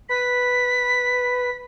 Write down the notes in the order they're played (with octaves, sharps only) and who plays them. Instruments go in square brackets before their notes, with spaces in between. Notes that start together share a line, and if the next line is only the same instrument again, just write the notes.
[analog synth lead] B4 [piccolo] B6